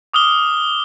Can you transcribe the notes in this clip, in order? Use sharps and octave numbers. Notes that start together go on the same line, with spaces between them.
D6 D#6 F6 G7